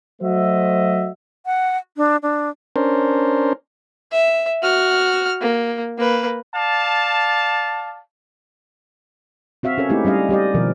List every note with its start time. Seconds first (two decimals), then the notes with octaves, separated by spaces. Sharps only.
0.22 F#3 A3 F#4 C5 D#5 E5
1.46 F#5
1.97 D4
2.23 D4
2.76 C#4 D4 A#4 C5
4.12 E5
4.62 F#4 F6
5.41 A#3
5.98 A#3 B4
6.55 D5 F5 A5
9.63 C4 F#4 E5 F5
9.78 C#4 A4 A#4 C#5
9.89 G#3 A3 C4 D#4 E4 G4
10.05 G3 C#4 D#5 F5
10.29 G3 G4 D5 D#5
10.54 B2 D#3 F3 A#4